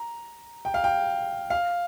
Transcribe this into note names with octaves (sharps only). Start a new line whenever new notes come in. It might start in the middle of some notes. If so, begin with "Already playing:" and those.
Already playing: A#5
G5
F5
G5
F5